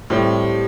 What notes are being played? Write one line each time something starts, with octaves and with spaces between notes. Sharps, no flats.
A2 G3 C4